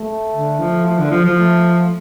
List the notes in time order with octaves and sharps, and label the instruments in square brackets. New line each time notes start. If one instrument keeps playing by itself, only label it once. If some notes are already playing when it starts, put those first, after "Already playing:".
Already playing: [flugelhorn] A3
[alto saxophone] D3
F3
F3
D3
F3
F3
[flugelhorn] A3